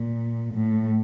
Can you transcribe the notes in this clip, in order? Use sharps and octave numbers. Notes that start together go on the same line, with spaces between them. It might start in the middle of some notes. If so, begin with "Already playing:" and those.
Already playing: A#2
A2